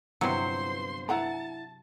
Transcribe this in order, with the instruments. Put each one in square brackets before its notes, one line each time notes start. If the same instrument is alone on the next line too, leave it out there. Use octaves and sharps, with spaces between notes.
[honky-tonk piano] G1 B3 C#7 [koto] C3 F#3 [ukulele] E4 [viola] C5 C6
[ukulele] E4 F#5 A#5 [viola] A5